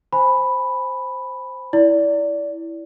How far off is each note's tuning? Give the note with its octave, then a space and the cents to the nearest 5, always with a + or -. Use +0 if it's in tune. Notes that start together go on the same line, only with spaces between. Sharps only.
C5 +0 G#5 +0 B5 +0
E4 +0 D5 -25